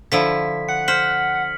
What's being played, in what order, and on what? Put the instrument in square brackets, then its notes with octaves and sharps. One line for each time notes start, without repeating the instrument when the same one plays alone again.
[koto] D3 F3 E4 [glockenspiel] B6
[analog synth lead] F#5 [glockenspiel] C#7
[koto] C5 [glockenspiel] F6 B6 F#7